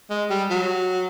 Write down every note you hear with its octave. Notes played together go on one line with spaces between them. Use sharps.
G#3
G3
F#3